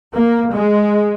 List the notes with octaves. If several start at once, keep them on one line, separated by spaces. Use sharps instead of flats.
A#3
G#3